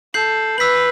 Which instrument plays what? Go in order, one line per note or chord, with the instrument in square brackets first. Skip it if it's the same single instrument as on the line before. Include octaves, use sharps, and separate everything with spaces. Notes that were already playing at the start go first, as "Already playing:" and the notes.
[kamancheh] A4 [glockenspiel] G6 C7 F#7
[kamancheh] B4 [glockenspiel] E6 B6 F#7